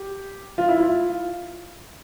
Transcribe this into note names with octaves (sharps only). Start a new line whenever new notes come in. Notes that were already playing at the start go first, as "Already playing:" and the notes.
Already playing: G4
F4
E4
F4